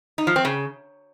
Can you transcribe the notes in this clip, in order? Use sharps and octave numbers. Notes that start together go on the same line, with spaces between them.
D#4
F3
C4
C#3